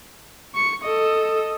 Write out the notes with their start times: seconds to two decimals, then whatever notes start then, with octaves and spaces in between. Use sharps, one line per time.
0.55 C#6 C#7
0.84 A4 D#5